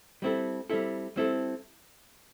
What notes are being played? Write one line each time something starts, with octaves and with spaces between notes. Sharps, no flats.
G3 C4 E4 A4
G3 C4 E4 A4
G3 C4 E4 A4